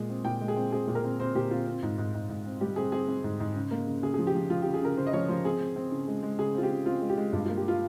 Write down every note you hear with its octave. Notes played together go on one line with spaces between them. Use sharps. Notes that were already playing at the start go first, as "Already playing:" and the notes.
Already playing: A#2 G#3 G#4
C4
A#2 G5
G#3
G#4
C4
C4 G#4
A#2
A#4
C4
C4 C5
A#2 G4
C4 F4
C4
G#2
G#2
G#2
G#2
C4
G3 G4
C4 G#4
C4 G#4
C4
G#2
G#2
C#3
A#3
C#3
C#3 G#4
G#4
F3
G4
F3
F3 F4
G4
C#3
G#4
C#3 A#4
C#3 C5
D#5
F3 C#5
F3 C5
C4 G#4
C4
C4
C#3
G#3
G#3
C#3 G#4
C4 F4
G4
C#3
C4 F4
G#3
G4
G#3
G2 F4
F4
A#3
G4
F4